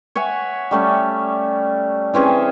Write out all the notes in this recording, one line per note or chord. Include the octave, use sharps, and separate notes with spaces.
C#5 E5 F#5 G#5
G3 A3 C#4
E3 C4 C#4 G#4